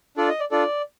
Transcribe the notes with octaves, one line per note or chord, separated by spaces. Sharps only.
D4 F4 A4 D5
D#5
D5
D4 F4 A4 D5